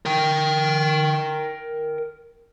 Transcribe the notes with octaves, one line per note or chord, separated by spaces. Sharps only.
A#4 G5